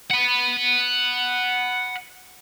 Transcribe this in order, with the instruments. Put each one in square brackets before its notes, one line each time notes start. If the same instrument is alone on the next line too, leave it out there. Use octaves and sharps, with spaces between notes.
[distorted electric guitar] F#5 B5